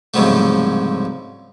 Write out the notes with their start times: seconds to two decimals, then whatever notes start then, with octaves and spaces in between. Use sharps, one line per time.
0.14 C2 G#2 C#3 F3 F#3 A3